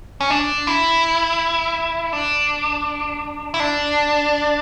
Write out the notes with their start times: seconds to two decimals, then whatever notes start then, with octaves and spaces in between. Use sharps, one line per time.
0.21 C#4
0.30 D4
0.67 E4
2.13 D4
3.54 E4
3.60 D4